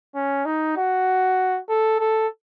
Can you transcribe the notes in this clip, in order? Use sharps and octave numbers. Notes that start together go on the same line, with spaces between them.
C#4
D#4
F#4
A4
A4